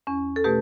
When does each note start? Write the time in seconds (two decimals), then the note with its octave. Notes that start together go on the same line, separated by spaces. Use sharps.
0.07 E2 C#4
0.36 A4
0.44 B2 A3 G4 B4